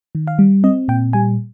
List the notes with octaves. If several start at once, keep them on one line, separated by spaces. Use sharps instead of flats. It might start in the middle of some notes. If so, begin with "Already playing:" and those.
D#3
F5
G3
C4 D#5
A#2 G5
G3 G#5